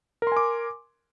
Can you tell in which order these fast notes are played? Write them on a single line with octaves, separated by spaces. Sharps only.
A#4 C6 G#5 D6